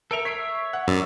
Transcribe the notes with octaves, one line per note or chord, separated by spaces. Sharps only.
A4 A#4 E5 D7 F7
C#5 E5 B6 C7 D7
F#5
F#2 D5 E6